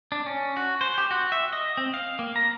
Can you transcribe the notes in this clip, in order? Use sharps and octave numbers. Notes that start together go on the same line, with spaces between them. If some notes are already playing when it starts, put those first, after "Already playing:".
D4
C#4
F#4
C5
G4
F#4
E5
D#5
C4
F5
A#3
A#5